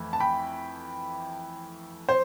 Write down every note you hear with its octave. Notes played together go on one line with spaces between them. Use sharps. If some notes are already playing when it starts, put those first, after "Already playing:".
Already playing: F2 E3 A3
A5
G5 B5
C5